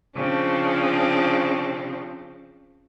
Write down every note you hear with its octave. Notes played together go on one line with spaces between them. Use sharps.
C#3 F3 C4 D4